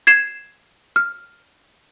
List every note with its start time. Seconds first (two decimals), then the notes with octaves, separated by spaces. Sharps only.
0.07 G#6 C7 E7
0.96 F6